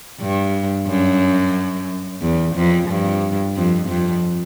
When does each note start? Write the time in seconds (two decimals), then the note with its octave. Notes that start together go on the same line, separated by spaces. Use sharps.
0.20 G2
0.87 F#2
2.22 E2
2.55 F2
2.89 G2
3.56 F2
3.88 F2